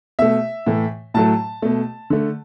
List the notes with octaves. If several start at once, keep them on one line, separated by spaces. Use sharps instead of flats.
B2 A3 E5
A2 E3 A3
A2 F#3 A3 A5
B2 A3
D3 A3